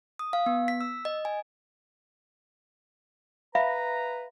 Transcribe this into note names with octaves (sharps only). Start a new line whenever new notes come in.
D#6
F5
B3
B6
E6
D#5
G#5
B4 E5 F5 A#5 B5